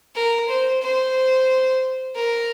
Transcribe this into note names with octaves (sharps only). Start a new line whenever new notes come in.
A#4
C5
C5
A#4